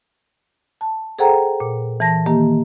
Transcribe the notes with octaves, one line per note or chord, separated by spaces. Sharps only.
A5
G#4 A4 C5 F#5 G5 A#5
A#2
E3 A5 A#6
D#3 A#3 G4